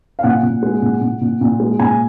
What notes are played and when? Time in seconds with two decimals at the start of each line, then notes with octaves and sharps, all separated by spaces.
0.19 F5
0.23 A#2 F#5
0.43 A#2
0.63 G#3
0.82 A#2
1.01 A#2
1.21 A#2
1.41 A#2
1.60 G#3
1.79 A#2 G#5